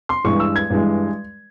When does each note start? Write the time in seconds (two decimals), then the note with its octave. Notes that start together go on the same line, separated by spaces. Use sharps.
0.09 C6
0.25 G2 E3 G#3 C#6
0.40 E6
0.56 G#6
0.70 G2 E3 G#3